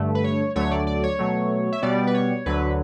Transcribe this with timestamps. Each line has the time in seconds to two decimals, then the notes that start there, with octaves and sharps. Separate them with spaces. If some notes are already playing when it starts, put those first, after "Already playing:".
Already playing: G2 D3 A3
0.15 B4
0.24 C#5
0.56 D2 D3 F#3 A3 C#5
0.71 D5
0.87 D5
1.03 C#5
1.19 B2 F#3 A3
1.72 E5
1.82 B2 G3 B3 D5
2.07 B4
2.14 C#5
2.46 D2 D3 F#3 B4